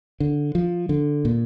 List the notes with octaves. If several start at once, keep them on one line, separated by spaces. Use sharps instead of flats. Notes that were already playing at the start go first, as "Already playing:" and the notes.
D3
F3
D3
A#2